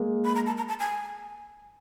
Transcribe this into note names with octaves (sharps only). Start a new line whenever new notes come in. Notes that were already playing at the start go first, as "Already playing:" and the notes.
Already playing: G#3 A#3
B5
A#5
A5
A#5
A5
G#5